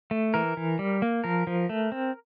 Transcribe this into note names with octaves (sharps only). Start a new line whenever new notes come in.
A3
E3 A#4
E3
G3
A#3
F3 A#4
F3
A3
C4